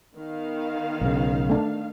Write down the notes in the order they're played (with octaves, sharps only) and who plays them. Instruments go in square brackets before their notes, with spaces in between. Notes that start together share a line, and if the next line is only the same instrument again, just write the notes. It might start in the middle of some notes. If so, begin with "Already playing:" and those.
[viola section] D#3 B3 F5
[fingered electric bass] B1 C#3
[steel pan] A3 D4